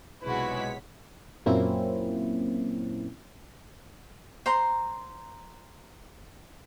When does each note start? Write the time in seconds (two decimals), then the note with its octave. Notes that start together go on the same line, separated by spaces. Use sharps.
0.23 B1 C3 G#3 E4 F#4 B4 C#5 B6
1.46 F#2 A#2 A#3 C4 C#4 E4
4.46 C5 A#5 C6